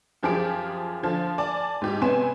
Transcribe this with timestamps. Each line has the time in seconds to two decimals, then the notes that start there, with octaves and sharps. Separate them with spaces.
0.23 F#2 F3 G4 G#4 D7
1.03 D3 F3
1.38 D5 G#5 A5
1.82 G#2 G4
2.01 C3 B3 C#4 G#5 C6 E7